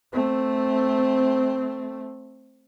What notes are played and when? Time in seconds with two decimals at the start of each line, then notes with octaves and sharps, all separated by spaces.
0.13 A3 C4